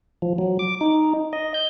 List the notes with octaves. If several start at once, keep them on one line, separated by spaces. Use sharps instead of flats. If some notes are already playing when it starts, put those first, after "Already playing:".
F3
F#3
D6
D#4
D#5
G6